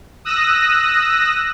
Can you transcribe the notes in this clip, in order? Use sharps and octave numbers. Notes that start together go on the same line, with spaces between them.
D#6 E6 F#6 A#6